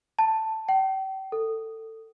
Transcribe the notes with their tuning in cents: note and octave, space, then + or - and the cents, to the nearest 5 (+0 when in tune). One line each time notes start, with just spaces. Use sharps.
A5 +10
G5 -35
A4 +20